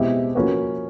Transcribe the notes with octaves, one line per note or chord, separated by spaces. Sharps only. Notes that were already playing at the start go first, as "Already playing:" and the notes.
Already playing: B2 G#3 C4 E4 G4
F3 A#3 C#4 F#4 B4